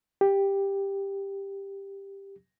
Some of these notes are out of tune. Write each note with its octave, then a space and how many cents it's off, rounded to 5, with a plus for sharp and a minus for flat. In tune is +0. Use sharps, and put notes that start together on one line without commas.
G4 +10